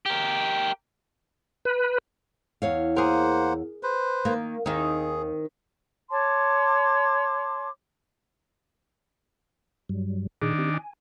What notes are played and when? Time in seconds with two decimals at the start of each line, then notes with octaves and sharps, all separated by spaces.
0.06 G4 A#4
1.65 B4
2.62 E2 C#5 F5
2.96 A#3 G#4 A#4 C5 F#5
3.83 B4 C5
4.25 D#3 A#3
4.66 D#2 D#3 C4 D#4 G#4
6.10 C#5 A5 C6 D6
9.89 G2 F#3 G3
10.42 A#2 D#3 D4 G#4
10.58 C4 G4
10.74 G#5